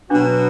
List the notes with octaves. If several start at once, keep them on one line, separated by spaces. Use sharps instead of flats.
B2 F#3 B3 D4 F#4